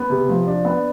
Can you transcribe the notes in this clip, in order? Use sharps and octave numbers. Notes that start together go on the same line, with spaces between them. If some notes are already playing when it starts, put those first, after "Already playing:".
Already playing: B3
C3
F3
D4
B3